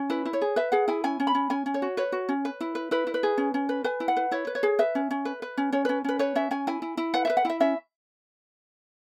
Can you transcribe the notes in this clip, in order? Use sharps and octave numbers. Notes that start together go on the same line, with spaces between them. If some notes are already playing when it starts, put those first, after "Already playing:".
Already playing: C#4
E4 B4
E4
C#5
G#4
B4 E5
G#4 F#5
E4 G#5
C#4 G#5
C#4
B5
C#4
C#4 G#5
C#4
C#5
F#4
B4 C#5
F#4
C#4
B4
E4
B4
E4 B4
E4
B4
G#4
C#4
C#4
B4
B4 G#5
E4
F#5
B4
E4 C#5
B4
C#5
G#4
B4 E5
C#4
C#4
B4
B4
C#4
C#4 C#5
C#4 B4
C#4 B4
B4 C#5
C#4 E5
C#4 G#5
E4 G#5
E4
E4
B4 F#5
B4 E5
F#5
E4 E5
C#4 E5